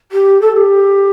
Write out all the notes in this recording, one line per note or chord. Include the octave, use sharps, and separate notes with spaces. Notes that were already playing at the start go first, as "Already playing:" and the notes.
G4
A4
A4
G4